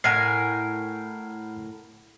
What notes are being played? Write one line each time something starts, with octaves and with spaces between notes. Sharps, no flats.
A2 A#4 F#5 G#5 F6 C7